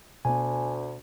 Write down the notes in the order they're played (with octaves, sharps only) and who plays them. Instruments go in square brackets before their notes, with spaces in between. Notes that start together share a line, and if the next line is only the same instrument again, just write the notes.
[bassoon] D2 [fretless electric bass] B2 B3 [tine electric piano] G#5